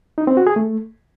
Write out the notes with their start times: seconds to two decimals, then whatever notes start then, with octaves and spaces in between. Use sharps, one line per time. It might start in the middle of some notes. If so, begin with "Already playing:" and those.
0.18 D#4
0.27 C4
0.37 F#4
0.47 G#4
0.56 A3